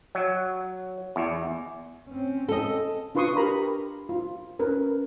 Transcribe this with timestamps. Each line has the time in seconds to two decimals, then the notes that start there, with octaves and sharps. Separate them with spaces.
0.15 F#3
1.16 E2
2.09 C4 C#4
2.49 A4 D#5
3.15 D4 F4 B4 C6 C#6 D#6
3.37 G4 A#4 A#5 B5
4.09 F4
4.59 C#4 A#4 B4